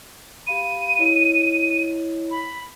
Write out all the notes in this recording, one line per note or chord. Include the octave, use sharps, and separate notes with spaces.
G4 F5 B5 D#7
E4 C#5 D#5
B5